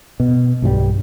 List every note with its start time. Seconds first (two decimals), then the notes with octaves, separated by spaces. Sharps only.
0.20 B2
0.62 B1 G2 E3 G3